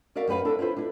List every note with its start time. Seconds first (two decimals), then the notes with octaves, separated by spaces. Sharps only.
0.15 F#4 A#4 D5 E5 F5
0.28 F#2 G4 B4 F5
0.45 D4 E4 A4 A#4
0.59 E4 F4 B4 C5
0.77 D4 E4